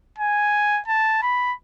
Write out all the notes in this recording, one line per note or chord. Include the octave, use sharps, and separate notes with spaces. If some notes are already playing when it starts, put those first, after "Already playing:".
G#5
A5
B5